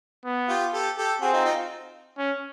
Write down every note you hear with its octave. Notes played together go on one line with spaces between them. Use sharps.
B3
F4 G4
G4 A4
G4 A4
C4 F#4 G#4
D#4 F4
D#4 F4
C#4